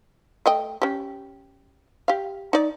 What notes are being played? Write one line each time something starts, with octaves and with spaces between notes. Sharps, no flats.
A3 D#5 G5
C#4 G4
G4 F5
D#4 D5